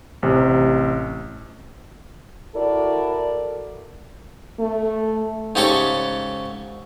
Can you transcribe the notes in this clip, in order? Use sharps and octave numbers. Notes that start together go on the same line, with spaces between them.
A1 C3
E4 F#4 A4 A#4 D5
A3
G#2 C#3 G4 A4 C#5 C#6